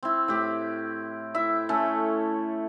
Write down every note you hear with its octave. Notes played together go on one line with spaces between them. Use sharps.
C4 E4
A2 G4
E4 E5
A3 C#4 A4